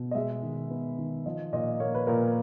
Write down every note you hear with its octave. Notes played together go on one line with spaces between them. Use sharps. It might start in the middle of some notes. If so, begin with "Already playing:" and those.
Already playing: B2
D#5
G#3 E5
D#3
B3
D#3
F3 D#5
A#2 D#5
A#3 C#5
B4
A#2 A#4